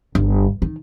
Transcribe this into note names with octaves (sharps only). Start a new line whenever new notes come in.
G1
D#3